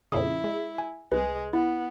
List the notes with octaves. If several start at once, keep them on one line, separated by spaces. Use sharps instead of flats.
F2 A#2 C#3 E4 D#6
G#3
G#5
C2 G#3 G#4 B4
B3 E4